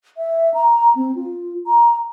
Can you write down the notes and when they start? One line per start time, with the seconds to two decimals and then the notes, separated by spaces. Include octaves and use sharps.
0.17 E5
0.54 A#5
0.95 C4
1.15 F4
1.67 A#5